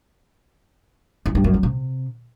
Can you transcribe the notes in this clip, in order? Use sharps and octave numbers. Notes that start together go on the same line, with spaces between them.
E3
G2
F#2
F#3
C3